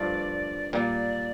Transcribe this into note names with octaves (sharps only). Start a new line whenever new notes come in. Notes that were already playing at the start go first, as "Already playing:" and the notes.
Already playing: G2 F3 A3 D4 F4 D5
A#2 G3 A#3 D5